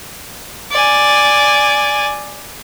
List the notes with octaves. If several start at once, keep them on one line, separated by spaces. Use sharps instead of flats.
D5 G#5